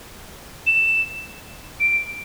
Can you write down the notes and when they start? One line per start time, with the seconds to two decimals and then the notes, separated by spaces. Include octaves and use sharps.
0.66 E7
1.80 D7